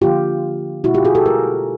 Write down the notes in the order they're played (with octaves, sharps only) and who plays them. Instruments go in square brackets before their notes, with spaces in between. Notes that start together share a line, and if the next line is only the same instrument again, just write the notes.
[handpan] D3 F3 A#3 F4 G4
B2 G#3 E4 F#4
F4 G4
F#4 G#4
G4 A4
G#4 A#4